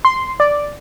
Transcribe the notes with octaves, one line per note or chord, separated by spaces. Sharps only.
C6
D5